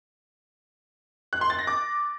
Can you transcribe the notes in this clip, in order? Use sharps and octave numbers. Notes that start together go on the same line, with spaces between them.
F#6
C6
A6
A#6
D6